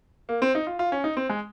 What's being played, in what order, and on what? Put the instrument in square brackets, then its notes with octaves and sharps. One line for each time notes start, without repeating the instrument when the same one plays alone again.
[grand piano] A#3
C4
D#4
F4
F4
C#4
D#4
C4
G#3